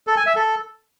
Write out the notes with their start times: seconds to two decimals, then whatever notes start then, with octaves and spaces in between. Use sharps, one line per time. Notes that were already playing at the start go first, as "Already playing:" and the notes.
0.07 A4
0.17 G#5
0.26 E5
0.36 A4